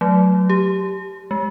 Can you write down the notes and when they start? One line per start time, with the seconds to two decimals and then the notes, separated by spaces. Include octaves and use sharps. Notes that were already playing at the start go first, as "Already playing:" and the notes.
0.01 F#3 A3
0.50 G4
1.31 G#3